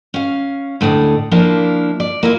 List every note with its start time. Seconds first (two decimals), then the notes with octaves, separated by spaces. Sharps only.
0.14 C#4 F5
0.81 D2 A2 D4 D#5
1.31 F3 A#3 D4 E4
2.00 D5
2.23 A#3 E4 F4